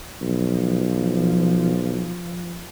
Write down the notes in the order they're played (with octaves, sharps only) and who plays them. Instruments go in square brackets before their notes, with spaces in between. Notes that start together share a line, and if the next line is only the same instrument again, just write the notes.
[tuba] B1 [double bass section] F3